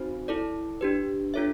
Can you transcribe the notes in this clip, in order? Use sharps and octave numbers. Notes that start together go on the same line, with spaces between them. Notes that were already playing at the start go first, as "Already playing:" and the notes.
Already playing: C4 D#4 F#4 C5
E4 A4 D5
D4 G4 B4
D4 F4 A4 C#5 E5